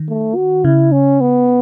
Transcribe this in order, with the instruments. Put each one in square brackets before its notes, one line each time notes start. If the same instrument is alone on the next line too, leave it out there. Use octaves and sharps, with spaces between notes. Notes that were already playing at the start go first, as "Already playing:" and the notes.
Already playing: [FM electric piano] D#3
[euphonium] A3
F#4
[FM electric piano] C#3 [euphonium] E4
[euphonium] C#4
B3